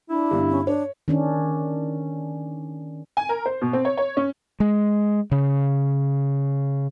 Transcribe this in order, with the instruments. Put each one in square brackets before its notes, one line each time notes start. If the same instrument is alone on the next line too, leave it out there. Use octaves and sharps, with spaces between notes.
[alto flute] D4 [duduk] E4
[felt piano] G2 D3 B3
[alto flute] C#4
[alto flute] D4 [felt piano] C#5
[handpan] D#3 C#4 D4
[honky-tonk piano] G#5
A#4
C5
B2
C4
C#5
C#5
C#4
[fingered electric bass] G#3
C#3